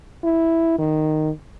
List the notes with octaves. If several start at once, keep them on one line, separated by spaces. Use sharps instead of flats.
E4
D#3